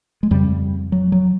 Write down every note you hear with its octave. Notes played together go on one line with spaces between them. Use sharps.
G#3
F2 C#3 G3
F#3
F#3